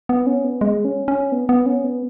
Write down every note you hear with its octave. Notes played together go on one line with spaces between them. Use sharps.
B3
C#4
B3
G#3
C#4
C#4
B3
B3
C#4
B3